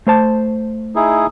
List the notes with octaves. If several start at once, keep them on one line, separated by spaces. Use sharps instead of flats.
A3 C5 A5
D#4 E4 G#4